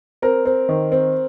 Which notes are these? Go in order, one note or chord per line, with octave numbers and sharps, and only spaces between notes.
C4 A#4
C4
D#3
C4